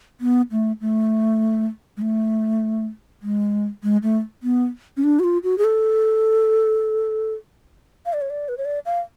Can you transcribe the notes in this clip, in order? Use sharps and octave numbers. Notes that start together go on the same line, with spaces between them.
B3
A3
A3
G#3
A3
G#3
G#3
A3
B3
C#4
D4
F#4
F4
F#4
G#4
A4
F5
D5
C#5
D5
B4
C#5
D5
F5